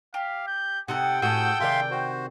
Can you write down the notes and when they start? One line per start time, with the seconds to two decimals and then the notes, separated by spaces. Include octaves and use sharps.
0.14 G4 F5
0.47 G6
0.88 C3 D#4 A4 F#5 G5 F#6
1.22 A2 F#4 G#4 A4 F#5 E6 G6
1.60 C3 D#3 D5 E5 F5 C6
1.91 F#4 C5